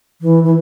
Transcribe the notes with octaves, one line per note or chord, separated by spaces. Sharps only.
E3
E3